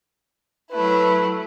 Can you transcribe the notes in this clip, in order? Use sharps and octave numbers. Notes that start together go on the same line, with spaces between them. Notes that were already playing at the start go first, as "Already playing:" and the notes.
F#3 A3 E4 B4